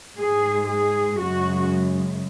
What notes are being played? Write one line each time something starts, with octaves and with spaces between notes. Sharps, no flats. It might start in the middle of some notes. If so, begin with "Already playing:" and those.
G#2 G#3 G#4
G#4
F#2 C#3 G#3 F#4